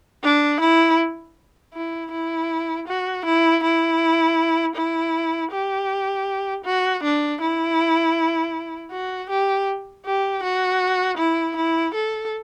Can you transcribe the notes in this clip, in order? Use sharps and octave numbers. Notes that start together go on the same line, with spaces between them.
D4
E4
E4
E4
F#4
E4
E4
E4
G4
F#4
D4
E4
F#4
G4
G4
F#4
E4
E4
A4